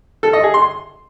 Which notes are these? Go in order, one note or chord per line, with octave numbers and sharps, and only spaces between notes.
A4
D#5
G#4
C6